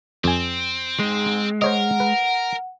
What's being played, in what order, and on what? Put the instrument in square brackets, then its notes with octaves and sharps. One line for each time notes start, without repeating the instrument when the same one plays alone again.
[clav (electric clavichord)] F2 G#5 [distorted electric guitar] C4
[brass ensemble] G#2 [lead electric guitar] G#3
[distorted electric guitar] A#4 [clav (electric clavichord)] C5 C#5 D#5 [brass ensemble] F#5
[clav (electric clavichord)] B4